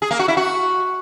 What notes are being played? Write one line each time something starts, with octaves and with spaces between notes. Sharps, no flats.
G#4
A#3
F#4
E4
F#4